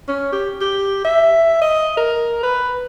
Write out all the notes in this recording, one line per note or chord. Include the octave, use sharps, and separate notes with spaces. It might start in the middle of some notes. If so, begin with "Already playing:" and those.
C#4
G4
G4
E5
D#5
A#4
B4